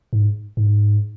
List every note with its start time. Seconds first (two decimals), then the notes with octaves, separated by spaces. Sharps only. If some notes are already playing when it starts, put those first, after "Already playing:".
0.13 G#2
0.57 G#2